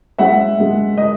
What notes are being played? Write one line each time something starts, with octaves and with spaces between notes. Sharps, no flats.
G#3 E5 F#5
G#3
D#5